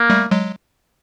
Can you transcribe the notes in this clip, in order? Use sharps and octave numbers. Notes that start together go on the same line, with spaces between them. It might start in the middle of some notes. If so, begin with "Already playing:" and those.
Already playing: A#3
G3 A3
F#3 G#3